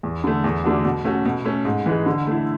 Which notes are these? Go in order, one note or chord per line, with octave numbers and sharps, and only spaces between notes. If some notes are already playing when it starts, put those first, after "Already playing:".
E2
D3 A3
E2
D3 A3 D4 F#4
B2
A3 C#4 F#4
B2
A3 C#4
G#2
E3 G#3
D3
A3 E4